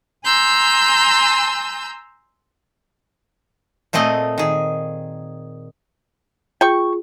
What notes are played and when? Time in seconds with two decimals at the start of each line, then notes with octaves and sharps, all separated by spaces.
0.24 G#5 A#5 C6 E6 G6
3.93 A#2 A3 C4 G#4 D#5
4.38 D#3 G#4
6.61 F4 G#4 G5 C#6